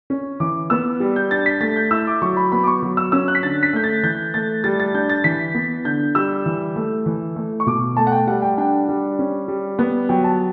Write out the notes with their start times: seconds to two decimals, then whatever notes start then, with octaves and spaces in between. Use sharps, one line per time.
0.10 C#4
0.40 E3 D6
0.70 B3 E6
1.00 G3
1.16 G6
1.31 D4 A6
1.46 B6
1.61 A3 A6
1.76 G6
1.91 E4 E6
2.07 D6
2.22 F#3 C#6
2.37 B5
2.52 B3 B5
2.63 D6
2.67 C#6
2.83 F#3
2.97 E6
3.12 C#4 E6
3.28 F#6
3.35 B6
3.43 D3 A6
3.63 B6
3.73 A3 G6
3.84 A6
4.03 E3 G6
4.34 A3 A6
4.64 G3 A6
4.80 A6
4.94 D4 G6
5.09 A6
5.24 E3 B6
5.54 B3
5.85 D3 G6
6.15 G3 E6
6.46 E3
6.76 A3
7.06 E3
7.36 A3
7.60 C#6
7.66 B2 D6
7.97 A3 A5
8.07 F#5
8.12 G5
8.27 G3 F#5
8.42 G5
8.58 D4 G5
8.89 G3
9.19 C#4
9.48 G3
9.79 B3
10.09 F#3 G5
10.24 A5